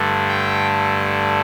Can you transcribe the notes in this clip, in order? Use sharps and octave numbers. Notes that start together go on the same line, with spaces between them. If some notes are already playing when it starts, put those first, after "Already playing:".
Already playing: G2 D3 A3
G5